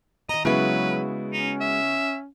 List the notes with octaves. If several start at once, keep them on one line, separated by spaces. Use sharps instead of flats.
D#3 D#5 A#5
C#3 F#3 G#3 B3 E4 F#4 B4
C#4 D#4
E5